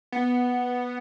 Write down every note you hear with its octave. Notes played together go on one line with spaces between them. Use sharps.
B3